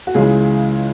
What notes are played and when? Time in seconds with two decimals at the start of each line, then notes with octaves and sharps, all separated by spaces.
0.07 F#4
0.14 C#2 C#3 E3 G#3 G#4